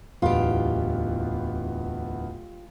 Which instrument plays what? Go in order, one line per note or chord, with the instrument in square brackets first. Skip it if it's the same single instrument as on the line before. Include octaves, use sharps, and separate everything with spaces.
[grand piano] D1 E2 B3 [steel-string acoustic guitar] F4 G4